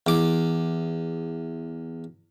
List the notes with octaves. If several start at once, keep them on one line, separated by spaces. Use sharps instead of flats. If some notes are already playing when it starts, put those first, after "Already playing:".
E2 D6